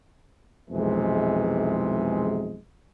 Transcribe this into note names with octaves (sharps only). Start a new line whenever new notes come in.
B1 F2 C3 E3 G#3